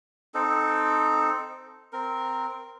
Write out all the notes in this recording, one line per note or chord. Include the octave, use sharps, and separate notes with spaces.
C4 D#4 A4
C4 A#4